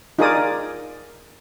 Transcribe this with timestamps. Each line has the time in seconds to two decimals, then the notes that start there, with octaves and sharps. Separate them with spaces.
0.19 D#4 F4 G#4 A#4 D5 D#6